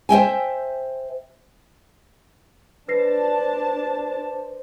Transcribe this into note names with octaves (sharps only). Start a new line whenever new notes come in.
C5 E5 G5 G#5
D4 B4 C5 A5 A#6 C7